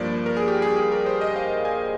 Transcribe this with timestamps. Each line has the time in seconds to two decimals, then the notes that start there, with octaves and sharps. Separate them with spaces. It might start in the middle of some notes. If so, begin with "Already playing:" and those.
Already playing: G2 F3 A#3 D5
0.26 A#4
0.37 G#4
0.48 G4
0.62 G#4
0.71 G4
0.77 G#4
0.92 A#4
1.06 C5
1.21 D#5
1.36 F5
1.65 G#5